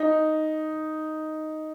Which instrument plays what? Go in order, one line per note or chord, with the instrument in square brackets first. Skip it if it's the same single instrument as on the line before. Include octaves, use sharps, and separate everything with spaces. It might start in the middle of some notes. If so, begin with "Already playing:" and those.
Already playing: [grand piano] D#4